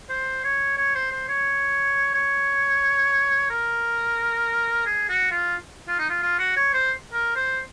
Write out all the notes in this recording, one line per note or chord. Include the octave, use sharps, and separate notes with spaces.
C5
C#5
C#5
C5
C5
C#5
C#5
A#4
G#4
F#4
F4
F4
D#4
F4
F4
F#4
C#5
C5
A#4
C5